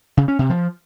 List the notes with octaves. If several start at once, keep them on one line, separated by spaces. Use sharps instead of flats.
C#3
C#4
C3
F3